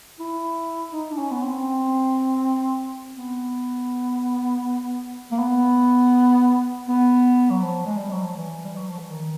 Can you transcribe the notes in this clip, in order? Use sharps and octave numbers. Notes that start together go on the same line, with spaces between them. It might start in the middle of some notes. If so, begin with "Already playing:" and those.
E4
D#4
D4
C#4
B3
C4
B3
A#3
B3
B3
F#3
F3
G#3
G3
F#3
F3
E3
G3
F#3
F3
E3
D#3